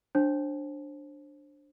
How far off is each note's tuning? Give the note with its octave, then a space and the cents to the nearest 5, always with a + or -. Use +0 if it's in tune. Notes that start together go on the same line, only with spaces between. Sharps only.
D4 +0 C5 +25 A5 -35